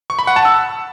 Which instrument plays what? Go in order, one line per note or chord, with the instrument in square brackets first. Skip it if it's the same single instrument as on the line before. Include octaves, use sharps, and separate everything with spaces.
[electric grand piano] C#6
B5
F#5
A5
E6